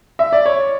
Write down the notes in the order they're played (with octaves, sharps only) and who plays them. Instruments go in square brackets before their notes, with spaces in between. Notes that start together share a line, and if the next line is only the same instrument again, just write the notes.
[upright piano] E5
D5
C#5